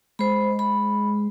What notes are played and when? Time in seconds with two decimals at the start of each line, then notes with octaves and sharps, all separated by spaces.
0.19 G#3 C5 B5
0.59 B5